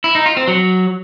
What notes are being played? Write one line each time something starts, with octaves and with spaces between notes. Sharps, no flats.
E4
D#4
F4
C4
F#3